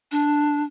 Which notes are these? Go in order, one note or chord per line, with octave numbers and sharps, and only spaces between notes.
D4